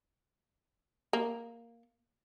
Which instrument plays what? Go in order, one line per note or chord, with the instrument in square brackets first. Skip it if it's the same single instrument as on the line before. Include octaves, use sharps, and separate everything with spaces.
[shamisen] A#3